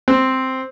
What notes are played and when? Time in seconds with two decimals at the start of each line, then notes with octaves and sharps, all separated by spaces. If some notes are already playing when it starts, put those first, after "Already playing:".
0.08 C4